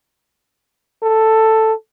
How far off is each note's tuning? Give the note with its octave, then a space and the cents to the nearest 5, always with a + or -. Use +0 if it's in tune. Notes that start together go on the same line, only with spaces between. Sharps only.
A4 +5